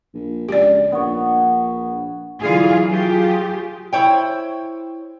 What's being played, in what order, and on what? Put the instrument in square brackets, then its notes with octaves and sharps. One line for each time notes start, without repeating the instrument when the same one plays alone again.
[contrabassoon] A#1
[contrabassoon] C#2 [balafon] G4 D5
[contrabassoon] A#1 [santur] B3 C#5
[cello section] D3 E3 F#3 F4 G#4 F5
F#3 F4 G4 G#4
[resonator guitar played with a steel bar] E4 C5 C#5 G5